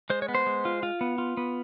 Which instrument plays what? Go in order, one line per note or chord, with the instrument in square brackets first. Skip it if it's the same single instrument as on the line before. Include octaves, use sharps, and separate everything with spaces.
[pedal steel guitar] G#3 C5
C#5
B3
C5
G#3
F4
F4
B3
F4
B3